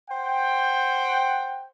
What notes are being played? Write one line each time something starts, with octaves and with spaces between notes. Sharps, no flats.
C5 F#5 G5